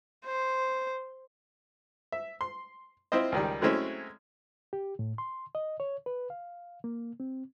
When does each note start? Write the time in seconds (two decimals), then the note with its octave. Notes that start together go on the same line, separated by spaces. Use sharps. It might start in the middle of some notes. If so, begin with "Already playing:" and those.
0.25 C5
2.12 E5
2.41 C6
3.12 C4 E4 F4 C5 D#5
3.32 C#2 D#3 G3
3.61 F#3 G#3 A3 C4 C#4 E4
4.73 G4
4.99 A2
5.18 C6
5.55 D#5
5.80 C#5
6.06 B4
6.30 F5
6.84 A#3
7.20 C4